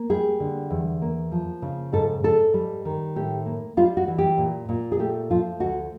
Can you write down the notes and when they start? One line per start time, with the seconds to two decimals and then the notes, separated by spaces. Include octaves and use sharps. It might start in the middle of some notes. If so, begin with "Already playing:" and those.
Already playing: A#3
0.10 G3 G#4
0.40 D3
0.70 E2
1.02 A#3
1.31 F3
1.62 C#3
1.93 G#2 A4
2.24 G#2 A4
2.54 G3
2.85 D#3
3.16 A2 G4
3.46 A#3
3.77 G3 F4
3.97 F#4
4.08 E3
4.18 G4
4.38 A#2
4.69 A#2
4.92 G#4
4.99 A3 G4
5.30 F3 F4
5.60 D2 F#4